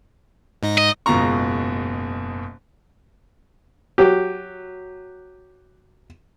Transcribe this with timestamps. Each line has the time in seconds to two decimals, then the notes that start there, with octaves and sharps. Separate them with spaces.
0.63 G#2 D#4 A#6
0.78 D#5
1.06 F#1 G#2 B2 F4 A#5 C#6
3.98 F#3 G4